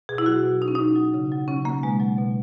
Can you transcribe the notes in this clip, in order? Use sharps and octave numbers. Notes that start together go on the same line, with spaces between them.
B2 G#4
E4
F#3 F#4
B2
F#3 D#4
C#4
B2 D#4
F#3
C#3
F#3
C#3 C#4
F#3 A#3
B2 G#3
F#3
B2